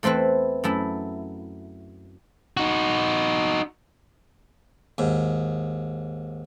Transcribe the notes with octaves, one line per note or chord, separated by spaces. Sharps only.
E2 A3 C4 E4 B4
F#2 A3 E4
D#4 F#4
D#2 G#2